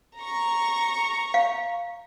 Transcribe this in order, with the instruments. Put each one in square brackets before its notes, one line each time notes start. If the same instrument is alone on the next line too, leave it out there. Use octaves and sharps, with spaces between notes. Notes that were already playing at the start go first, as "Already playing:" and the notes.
[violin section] A#5 C#6
[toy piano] F5